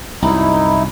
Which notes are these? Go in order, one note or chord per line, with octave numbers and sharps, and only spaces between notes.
C2 F#2 D#4 E4